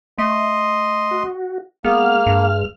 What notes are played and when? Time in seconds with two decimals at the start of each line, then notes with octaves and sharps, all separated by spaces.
0.18 A3 D#5 C6
1.11 F#4
1.84 G#3 A#3 B3 F6
2.26 G2